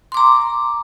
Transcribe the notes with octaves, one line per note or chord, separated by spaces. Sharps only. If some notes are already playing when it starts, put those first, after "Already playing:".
A#5 C6 D6